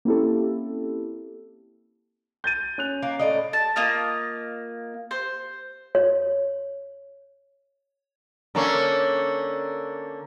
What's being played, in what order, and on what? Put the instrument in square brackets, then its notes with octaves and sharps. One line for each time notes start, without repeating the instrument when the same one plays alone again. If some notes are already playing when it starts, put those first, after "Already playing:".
[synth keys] A#3 C4 C#4 E4 G4 A4
[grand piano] G6 A6 D#7
C#4 F#6 F7
[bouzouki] A#3
A2 D5 D#5
[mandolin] A5
A#3 F4 D#5 F6
C5
[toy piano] C#5
[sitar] D3 A#3 C#4